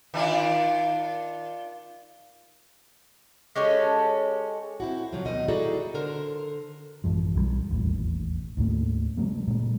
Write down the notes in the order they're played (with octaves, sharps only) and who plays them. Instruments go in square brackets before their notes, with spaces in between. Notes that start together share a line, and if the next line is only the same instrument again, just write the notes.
[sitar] D#3 D4 F4
[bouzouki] G#3 C#4 G4 A4
[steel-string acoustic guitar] C4 E4 F#4
C3 F3 F#3
D2 B2 D#3 D#5
D#4 E4 F#4 G#4 A4 D5
D3 A#4 C5
[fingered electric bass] A1 F#2 E3 F3
B1 D#3 G3
E1 A1 D#2
D2 G#2 A#3
C3 F#3 G#3 A#3
A#2 F#3 G#3 A#3